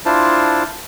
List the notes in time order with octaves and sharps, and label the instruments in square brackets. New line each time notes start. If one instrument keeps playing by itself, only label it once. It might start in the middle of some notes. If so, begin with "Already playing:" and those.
[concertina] D4 E4 F4 C5 A5